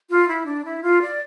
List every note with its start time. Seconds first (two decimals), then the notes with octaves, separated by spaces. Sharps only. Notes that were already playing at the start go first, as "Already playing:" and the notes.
0.10 F4
0.28 E4
0.46 D4
0.64 E4
0.82 F4
1.00 D5